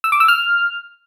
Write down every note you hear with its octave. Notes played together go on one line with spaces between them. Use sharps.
E6
D6
E6
F6